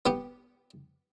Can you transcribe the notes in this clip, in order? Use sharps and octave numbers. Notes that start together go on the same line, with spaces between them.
B3 G4